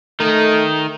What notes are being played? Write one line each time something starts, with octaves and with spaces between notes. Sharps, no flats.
D#3 A3 D#4